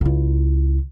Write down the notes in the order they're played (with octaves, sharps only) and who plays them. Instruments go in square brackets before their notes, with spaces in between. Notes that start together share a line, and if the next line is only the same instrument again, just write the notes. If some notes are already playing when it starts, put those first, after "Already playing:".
[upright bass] C#2 E4